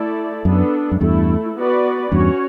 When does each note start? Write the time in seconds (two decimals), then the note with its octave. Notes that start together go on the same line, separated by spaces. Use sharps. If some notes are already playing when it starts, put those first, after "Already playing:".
Already playing: A3 E4 A4 D5
0.45 F#2 B3 D4 A4
0.92 F#2
1.00 E2 G2 A3 E4 A4
1.56 B3 F#4 B4 D5
2.12 E2 G2 C#4 F#4 C#5